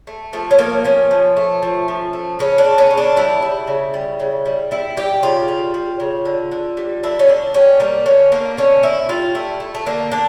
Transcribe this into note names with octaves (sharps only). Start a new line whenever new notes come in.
A3
F3 A3
C#4
A3 A#3
F3 C#4
F3
A3
F3
F3
A3
C#3 C#4
D4
C#3
C#4
C#3
D4
G3 E4
G3
C#3
G3
C#3
G3
G3 E4
G3 G4
C#3 F4
G3
G3
C#3
D3
D3
G3
D3 E4
C#4
D3 D4
G3 C#4
G3 A#3
D3 C#4
D3 A#3
D3 C#4
D3 E4
G3 F4
A3 E4
A3
A3
D3 A#3
D3 D4